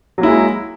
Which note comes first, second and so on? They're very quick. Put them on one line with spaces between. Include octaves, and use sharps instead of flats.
F#3 A#3 E4 G#3